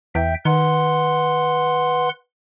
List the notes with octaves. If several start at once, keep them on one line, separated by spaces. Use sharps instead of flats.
E2 E5 G5 G6
D#3 B4 F#5 C6